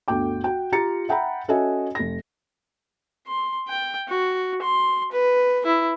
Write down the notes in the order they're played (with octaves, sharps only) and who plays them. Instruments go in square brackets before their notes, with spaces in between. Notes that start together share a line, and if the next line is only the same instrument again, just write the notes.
[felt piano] G1 D2 F#4 G5 D6
F#4 G5
F4 G4 A#5 A6 C#7
E5 F#5 G5 A#5 B5
C#4 F#4 A4 D#5 E5 G#5
F1 A#6
[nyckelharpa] C6
G5
F#4
C6
B4
E4